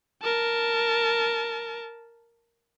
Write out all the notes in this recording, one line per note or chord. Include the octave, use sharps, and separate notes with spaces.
A#4 A5